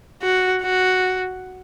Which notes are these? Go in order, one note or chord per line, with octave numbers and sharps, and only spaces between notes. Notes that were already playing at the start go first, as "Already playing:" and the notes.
F#4
F#4